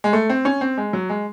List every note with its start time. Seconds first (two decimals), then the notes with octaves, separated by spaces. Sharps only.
0.04 G#3
0.13 A3
0.30 C4
0.45 C#4
0.61 C4
0.78 G#3
0.93 F#3
1.09 G#3